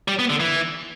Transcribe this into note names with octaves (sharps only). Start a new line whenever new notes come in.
G3
B3
D3
E3